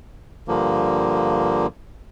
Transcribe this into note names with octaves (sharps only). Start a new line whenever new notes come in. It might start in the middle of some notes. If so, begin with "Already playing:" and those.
G2 D3 F3 A#3